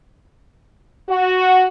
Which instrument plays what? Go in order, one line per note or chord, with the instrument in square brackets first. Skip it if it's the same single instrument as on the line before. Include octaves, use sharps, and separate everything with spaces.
[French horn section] F#4